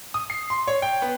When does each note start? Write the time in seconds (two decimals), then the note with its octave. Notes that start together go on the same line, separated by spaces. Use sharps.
0.14 D#6
0.30 C7
0.50 C6
0.67 C#5
0.82 G5
1.02 B3